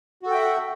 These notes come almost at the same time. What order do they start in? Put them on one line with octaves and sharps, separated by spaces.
F#4 A4 G5 E5 F#5